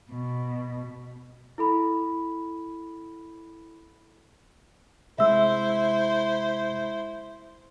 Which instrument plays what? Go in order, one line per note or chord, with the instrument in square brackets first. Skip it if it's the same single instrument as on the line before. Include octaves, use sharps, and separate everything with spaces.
[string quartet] B2
[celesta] E4 A4 B5
[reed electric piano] C3 G#3 [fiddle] E4 C5 [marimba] E5 E6